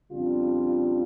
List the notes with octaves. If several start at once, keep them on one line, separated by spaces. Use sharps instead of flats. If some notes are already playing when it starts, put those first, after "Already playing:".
F2 C#3 G3 D4 F4